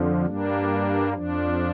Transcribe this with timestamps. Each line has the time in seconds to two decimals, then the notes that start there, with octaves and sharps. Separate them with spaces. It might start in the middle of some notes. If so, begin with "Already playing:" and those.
Already playing: F2 D3 F3
0.26 G2 G3 A#3 D4
1.13 F2 F3 D4